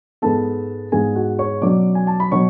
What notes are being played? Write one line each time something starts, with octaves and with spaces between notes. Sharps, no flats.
G#2 G#3 B3 A4 A5
G#2 G#3 B3 G#4 G#5
F#4 F#5
C#5 C#6
B2 F#3 C#4 D5 D6
G#5
A5
B5
B2 F#3 C#5 C#6